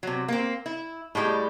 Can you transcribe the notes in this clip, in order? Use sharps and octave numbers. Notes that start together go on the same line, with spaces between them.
C3 F#3
A#3 C4
E4
A2 G3 G#3 G4